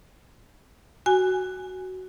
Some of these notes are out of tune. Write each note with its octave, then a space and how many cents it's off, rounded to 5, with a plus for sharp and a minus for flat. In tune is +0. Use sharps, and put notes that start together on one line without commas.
F#4 +5 G#5 +0